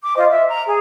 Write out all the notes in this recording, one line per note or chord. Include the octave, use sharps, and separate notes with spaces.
D6
F4 C5 D#5
E5
A#5
G#4